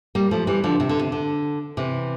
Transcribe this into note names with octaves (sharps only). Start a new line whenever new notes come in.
G3 A#3
F3 A3
E3 G3
D3 F3
C3
D3
C3
D3
C3 E3